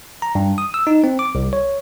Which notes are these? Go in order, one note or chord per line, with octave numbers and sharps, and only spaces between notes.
A#5
G2
D#6
E6
D#4
C4
D6
C2
C#5